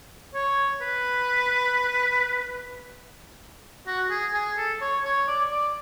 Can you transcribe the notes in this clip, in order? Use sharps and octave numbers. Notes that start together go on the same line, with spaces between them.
C#5
B4
F#4
G#4
G#4
A4
C#5
C#5
D5
D5